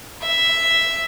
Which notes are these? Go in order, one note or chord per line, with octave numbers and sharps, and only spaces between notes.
E5